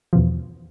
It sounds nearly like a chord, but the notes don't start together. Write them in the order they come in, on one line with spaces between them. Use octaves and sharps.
F3 B2 E2